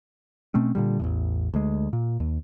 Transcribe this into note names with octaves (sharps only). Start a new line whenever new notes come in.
B2 A3 C4 C#4
A#2 D3 G3
A1 E2 A2
D2 G#3
A#2
D#2